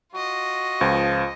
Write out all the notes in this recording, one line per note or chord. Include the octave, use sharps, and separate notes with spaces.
F4 F#4 D#5
C#2 F3